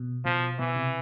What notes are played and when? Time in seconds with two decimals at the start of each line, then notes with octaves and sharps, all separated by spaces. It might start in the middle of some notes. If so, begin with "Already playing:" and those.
Already playing: B2
0.25 B2 F3
0.59 B2 E3
0.76 C3